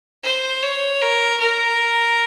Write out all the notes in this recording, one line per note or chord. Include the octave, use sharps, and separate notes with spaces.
C5
C#5
A#4
A#4